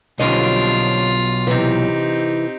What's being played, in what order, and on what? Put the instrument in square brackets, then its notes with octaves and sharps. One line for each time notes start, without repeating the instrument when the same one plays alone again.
[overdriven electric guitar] B1 [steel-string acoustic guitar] F2 C#4 D#5 [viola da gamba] D3 G3 D4 [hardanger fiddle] F4
[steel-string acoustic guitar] C3 E3 [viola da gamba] C4 D#4 G4